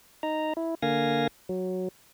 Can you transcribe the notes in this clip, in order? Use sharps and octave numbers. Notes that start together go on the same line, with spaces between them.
D#4 A#5
E4
D3 A#3 F5 G#5 A#6
F#3